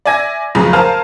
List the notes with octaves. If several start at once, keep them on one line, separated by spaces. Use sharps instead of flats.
D5 E5 G#5 G#6 A#6
F1 B1 C#3 F3 A#5
A#4 C5 F5 G#5 A5 F6